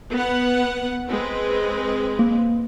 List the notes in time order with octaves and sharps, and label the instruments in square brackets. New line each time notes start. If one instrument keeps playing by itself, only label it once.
[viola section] B3 B4 F#5
G#3 C4 B4
[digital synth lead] A#3